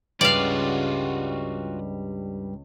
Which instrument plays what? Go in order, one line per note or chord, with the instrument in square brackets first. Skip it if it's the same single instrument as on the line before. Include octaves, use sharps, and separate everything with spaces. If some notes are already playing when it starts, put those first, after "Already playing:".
[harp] C#2 [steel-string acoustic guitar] G2 G3 [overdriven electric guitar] F4 F#4 [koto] D5 F5